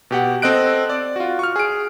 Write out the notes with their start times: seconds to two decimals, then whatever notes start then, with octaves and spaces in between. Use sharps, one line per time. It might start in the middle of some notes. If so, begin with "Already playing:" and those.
0.11 B2 G4 F#5
0.42 C4 A4 D#5 F#6 D7
0.90 D5
1.16 F4 F#4
1.39 C#6 F6
1.56 G#4 D7